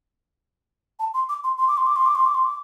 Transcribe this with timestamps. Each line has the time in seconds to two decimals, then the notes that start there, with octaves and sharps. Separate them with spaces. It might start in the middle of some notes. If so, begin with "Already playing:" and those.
0.99 A5
1.14 C6
1.29 D6
1.44 C6
1.58 C6
1.68 D6
1.77 C6
1.86 D6
1.96 C6
2.06 D6
2.15 C6
2.26 D6
2.35 C6
2.45 D6